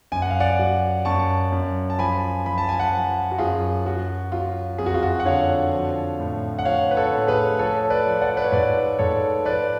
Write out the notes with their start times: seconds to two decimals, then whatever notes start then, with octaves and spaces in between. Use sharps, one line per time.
0.12 F#2 G#5
0.22 F#5
0.30 F5
0.40 D5 F#5
0.59 F#3
1.05 F#2 A5 C#6
1.52 F#2
1.90 A5
1.98 F3 G#5 B5
2.46 F3 B5
2.58 A5
2.69 G#5
2.79 F#5 A5
2.92 F3
3.31 F#4
3.38 F#2 F4 G#4
3.85 F#3 F#4
4.32 F#3 F4
4.78 F2 G#4
4.86 F#4
4.94 F4
5.03 F#4
5.20 F#5
5.25 D3 C#5 F5
5.73 F3
6.20 A2
6.59 F#5
6.65 F3 C#5 F5
6.91 B4
6.96 A4 C#5
7.12 A2
7.27 G#4 B4
7.59 F3 A4 C#5
7.90 B4 D5
8.06 F3
8.21 D5 F#5
8.37 B4
8.44 C#5
8.52 G#2 B4 D5
8.99 G#2 A4 C#5
9.45 F3 B4 D5